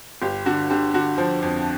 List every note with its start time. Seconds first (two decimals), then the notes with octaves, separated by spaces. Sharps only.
0.22 G1 G4
0.46 D3 F#4
0.70 D3 G4
0.94 D3 F#4
1.18 F3
1.42 F2